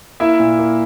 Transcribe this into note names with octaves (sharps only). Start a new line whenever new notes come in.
A#3 E4 E5
A#2
A#3